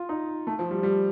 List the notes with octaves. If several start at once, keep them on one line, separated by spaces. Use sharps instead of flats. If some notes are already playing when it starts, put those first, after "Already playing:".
Already playing: F4
D#4
A3
F3
G3
G3